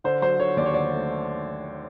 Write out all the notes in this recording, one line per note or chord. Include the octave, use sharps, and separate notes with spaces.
D3 C5
F#3 C5
D3 C#5
D#2 D5
C#5
D3 D5
A3